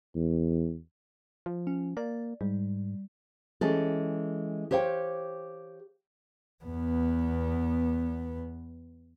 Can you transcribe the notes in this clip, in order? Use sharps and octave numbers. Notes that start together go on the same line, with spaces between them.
E2
F3
C#4
A#3 D5
G#2 G3
E3 G#3 C#4 G4 A4
G4 C5 C#5 F5 G5
E2 B3